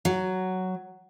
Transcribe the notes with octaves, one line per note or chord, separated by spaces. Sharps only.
F#3